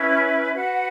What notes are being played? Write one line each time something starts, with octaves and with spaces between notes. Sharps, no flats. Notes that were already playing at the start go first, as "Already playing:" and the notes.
Already playing: C#4 E4 B4 E5
F#4 B4 F#5